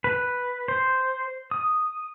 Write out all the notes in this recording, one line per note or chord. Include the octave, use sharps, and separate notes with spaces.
B4
C5
D#6